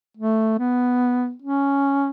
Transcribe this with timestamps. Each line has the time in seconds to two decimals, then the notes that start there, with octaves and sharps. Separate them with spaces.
0.18 A3
0.59 B3
1.42 C#4